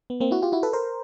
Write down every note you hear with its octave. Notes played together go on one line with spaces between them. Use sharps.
B3
A#3 C4
E4 F#4
F4 G4
E4 F#4
A4 B4
A#4 C5